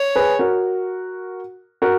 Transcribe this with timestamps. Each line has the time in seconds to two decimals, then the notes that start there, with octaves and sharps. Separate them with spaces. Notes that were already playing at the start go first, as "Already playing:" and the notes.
Already playing: C#5
0.15 G#4 B4
0.39 F#4 A#4
1.82 F#4 A#4